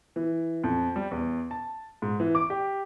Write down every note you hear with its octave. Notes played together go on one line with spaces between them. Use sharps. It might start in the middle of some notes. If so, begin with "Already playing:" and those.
E3
F2
G3
E2
A5
G#2
E3
D6
G4